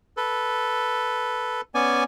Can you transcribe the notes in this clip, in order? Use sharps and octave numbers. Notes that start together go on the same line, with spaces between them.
A4 B4
B3 C#4 D5 G#5